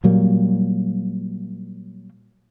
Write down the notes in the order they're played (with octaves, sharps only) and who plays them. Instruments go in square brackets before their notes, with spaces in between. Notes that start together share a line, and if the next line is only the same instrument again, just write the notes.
[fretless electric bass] A#2 F#3 G3 A#3